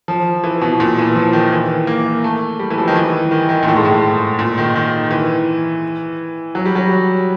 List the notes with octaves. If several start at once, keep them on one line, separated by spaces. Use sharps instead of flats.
F3
E3
B2
A#2
E3
F3
D#3
E3
A#3
A3
G3
E3
F3
D#3
E3
D#3
D#3
A#2
A2
G#2
A2
A#2
D#3
D#3
E3
F#3
G3
F#3